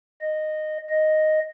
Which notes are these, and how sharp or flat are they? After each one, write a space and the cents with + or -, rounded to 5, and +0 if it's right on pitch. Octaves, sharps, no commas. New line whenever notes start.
D#5 -10
D#5 +0